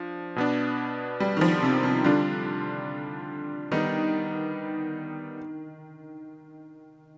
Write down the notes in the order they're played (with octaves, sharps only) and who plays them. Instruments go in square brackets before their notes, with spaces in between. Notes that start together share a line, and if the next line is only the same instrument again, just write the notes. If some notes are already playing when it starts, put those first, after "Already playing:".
Already playing: [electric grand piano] F3 D4
B2 B3 D4
[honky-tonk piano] G3
D#3
F3
C3
C3
[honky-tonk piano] D3 [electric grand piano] G3 D4 F4
[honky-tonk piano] D#3 [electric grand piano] G3 B3 D#4